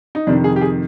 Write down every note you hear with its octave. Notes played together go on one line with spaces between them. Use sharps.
D#4
F2 C3 D#3 D4
G#4
G4
G#4